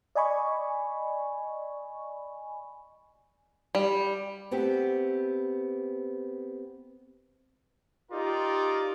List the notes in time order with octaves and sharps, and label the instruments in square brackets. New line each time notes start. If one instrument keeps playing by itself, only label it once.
[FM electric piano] D5 D#5 G#5 B5 C#6
[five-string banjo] G3
[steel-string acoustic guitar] A3 B3 C4 G4
[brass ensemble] D#4 F4 G4 A#4 D5